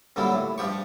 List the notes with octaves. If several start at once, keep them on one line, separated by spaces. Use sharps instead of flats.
G2 A#2 D3 F#3 G3 E4
A2
G2 F3 G4 C#6